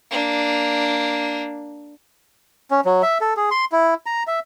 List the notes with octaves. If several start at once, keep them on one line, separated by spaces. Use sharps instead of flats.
A#3 D4
C#4
F#3
E5
A4
G#4
C6
E4
A#5
E5